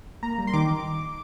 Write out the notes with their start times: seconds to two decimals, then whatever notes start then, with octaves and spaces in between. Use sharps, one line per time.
0.23 A#3 A#5
0.38 G3
0.47 C6
0.53 D#3 D6